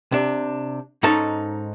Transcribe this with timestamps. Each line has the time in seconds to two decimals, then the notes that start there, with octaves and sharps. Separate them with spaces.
0.12 C3 D4
1.03 G#2 C#4 D#4 A4 A5